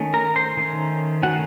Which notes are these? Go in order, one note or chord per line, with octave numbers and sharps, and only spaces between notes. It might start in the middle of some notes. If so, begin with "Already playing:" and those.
Already playing: D#3 A3 C#4
A#4 A#5
C5 C6
D#3 A3 C#4
D#3 A3 C#4 F#4 F#5